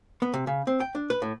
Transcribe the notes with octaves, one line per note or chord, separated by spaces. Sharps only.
B3
C3
C#3
C4
G5
D4
B4
A2